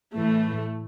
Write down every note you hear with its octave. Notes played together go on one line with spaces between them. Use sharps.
A2 E3 A3